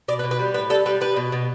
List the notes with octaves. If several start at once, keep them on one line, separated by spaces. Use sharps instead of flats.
B2 D5
B4
B2
B4
G3
A2 B4
G3 A4
G3 B4
G3 B4
B2
B2